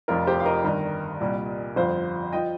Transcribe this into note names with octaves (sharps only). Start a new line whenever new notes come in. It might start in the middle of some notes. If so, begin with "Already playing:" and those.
F1 F2 F3 F4 A#4
G4 C5
F5
A#4 D#5
G1 G2 D#3
C2 A#2 G3
G1 F2 F3 C5 F5
F3 D#5 G5